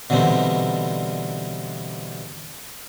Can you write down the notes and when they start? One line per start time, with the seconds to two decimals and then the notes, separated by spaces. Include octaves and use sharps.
0.10 B2 D3 E3 G3 C4 D#4